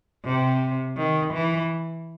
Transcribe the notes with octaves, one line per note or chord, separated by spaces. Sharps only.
C3
D#3
E3